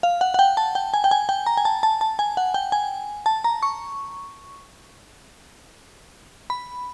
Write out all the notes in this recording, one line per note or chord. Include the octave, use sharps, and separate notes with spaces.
F5
F#5
F#5
G5
A5
G5
G#5
G5
G#5
G5
A#5
G#5
A5
A5
A5
G#5
F#5
G5
G#5
A5
A#5
C#6
B5